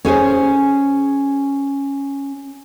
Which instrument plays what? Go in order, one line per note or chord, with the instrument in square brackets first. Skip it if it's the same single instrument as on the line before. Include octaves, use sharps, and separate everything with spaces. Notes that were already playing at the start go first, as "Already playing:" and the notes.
[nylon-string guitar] C#4 G#4 C5 C#5